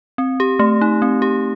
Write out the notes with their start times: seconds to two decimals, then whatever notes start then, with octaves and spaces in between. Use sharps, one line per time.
0.18 C4
0.40 G4
0.59 A3
0.81 D#4
1.02 C4
1.22 G4